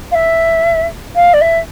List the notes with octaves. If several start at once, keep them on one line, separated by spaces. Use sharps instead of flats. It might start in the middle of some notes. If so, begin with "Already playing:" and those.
F5
E5
F5
D5
E5